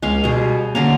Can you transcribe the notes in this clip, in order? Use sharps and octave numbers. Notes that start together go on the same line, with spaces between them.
C#2 G#3 C#4 F5
B2 G3 G#4
D3 A#3 C#4 F5